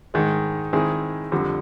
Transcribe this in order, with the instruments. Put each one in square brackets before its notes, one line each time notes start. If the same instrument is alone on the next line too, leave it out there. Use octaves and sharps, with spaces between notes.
[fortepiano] G#2 D#3 G#3
D#3 G#3 C4 E4 G#4
F2 D3 G3